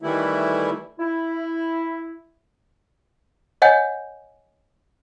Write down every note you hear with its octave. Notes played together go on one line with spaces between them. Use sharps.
D#3 E3 G3 A3 E4
E4
C#5 D#5 F#5 G#5 G6